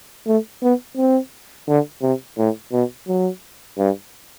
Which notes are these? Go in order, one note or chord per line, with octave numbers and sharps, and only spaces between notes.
A3
B3
C4
D3
C3
A2
B2
F#3
G2